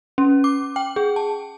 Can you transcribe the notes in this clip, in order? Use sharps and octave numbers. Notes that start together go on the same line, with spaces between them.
C#4
D6
G5
G#4
A5